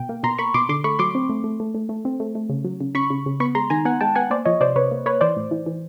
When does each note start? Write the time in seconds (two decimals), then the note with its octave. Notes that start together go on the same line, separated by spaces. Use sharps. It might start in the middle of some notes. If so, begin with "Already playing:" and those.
Already playing: B2 G5
0.09 A#3
0.23 B2 A#5 C6
0.38 A#3 B5 C#6
0.54 B2 C6 D6
0.69 D3 C6 D6
0.84 A3 B5 C#6
0.99 F#3 C6 D6
1.15 C4
1.30 A3
1.44 A3
1.60 A3
1.75 A3
1.89 A3
2.05 C4
2.20 A3
2.35 A3
2.49 C#3
2.65 F#3
2.81 C#3
2.95 C#3 B5 C#6
3.10 C#3
3.26 C#3
3.40 B3 B5 C#6
3.55 G#3 A#5 C6
3.70 D#3 G#5 A#5
3.85 B3 F#5 G#5
4.01 G#3 G5 A5
4.15 B3 F#5 G#5
4.30 A#3 C5 D5
4.45 F3 C#5 D#5
4.61 C3 C5 D5
4.76 C3 B4 C#5
4.92 A#3
5.06 A#3 B4 C#5
5.21 E3 C5 D5
5.37 A2
5.51 E3
5.66 E3